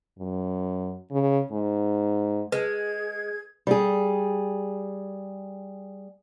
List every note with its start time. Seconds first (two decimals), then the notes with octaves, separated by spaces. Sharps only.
0.19 F#2
1.11 C#3
1.52 G#2
2.52 G#3 G#4 B4 G#6
3.67 G3 G#4